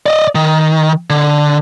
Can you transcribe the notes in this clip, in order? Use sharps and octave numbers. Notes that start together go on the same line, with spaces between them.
D5 D#5
D#3
D3